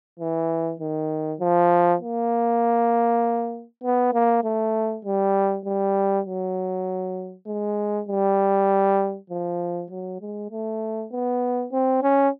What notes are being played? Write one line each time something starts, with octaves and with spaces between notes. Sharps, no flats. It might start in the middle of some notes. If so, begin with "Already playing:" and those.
E3
D#3
F3
A#3
B3
A#3
A3
G3
G3
F#3
G#3
G3
F3
F#3
G#3
A3
B3
C4
C#4